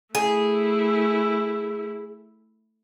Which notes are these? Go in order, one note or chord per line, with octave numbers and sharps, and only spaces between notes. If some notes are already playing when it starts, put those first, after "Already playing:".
A3 E4 G#4